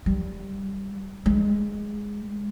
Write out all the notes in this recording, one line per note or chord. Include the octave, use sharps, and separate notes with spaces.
G3
G#3